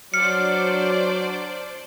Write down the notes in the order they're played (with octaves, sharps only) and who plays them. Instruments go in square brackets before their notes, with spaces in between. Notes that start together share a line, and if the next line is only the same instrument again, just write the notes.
[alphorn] F#3 [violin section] D4 C5 D5 [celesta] F6 [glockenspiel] C#7